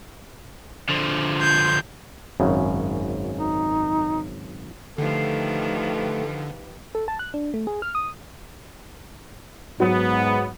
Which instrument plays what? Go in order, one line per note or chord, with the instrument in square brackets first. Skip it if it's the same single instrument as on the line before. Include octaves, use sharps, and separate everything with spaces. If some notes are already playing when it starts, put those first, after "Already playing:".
[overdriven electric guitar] D3 F3
[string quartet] C6 G6 G#6
[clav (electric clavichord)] G#1 F#2 C#3
[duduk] D#4
[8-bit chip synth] D3 [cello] D#3 F3 [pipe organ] A3 [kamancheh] G4 B4
[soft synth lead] A4
A5
F#6
D4
A3
G#4
F6
D#6
[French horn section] G#2 [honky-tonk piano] F#3 [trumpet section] B3